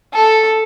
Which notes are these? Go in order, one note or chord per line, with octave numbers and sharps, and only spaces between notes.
A4